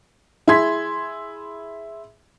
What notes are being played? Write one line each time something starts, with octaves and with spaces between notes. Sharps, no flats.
E4 G#4 C6 G#6 B6